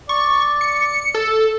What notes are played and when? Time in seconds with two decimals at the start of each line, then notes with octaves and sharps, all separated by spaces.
0.09 D5 C#6
0.61 C#7
1.14 A4